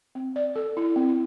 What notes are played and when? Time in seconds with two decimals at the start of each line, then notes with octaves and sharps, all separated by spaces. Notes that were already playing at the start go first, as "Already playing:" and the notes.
0.15 C4
0.36 D5
0.56 A4
0.77 E4
0.96 C4